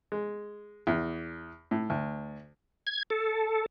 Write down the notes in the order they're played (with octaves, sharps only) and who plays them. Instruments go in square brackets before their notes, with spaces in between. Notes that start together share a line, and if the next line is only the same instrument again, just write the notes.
[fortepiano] G#3
E2
A2
D2
[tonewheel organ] G#6
A4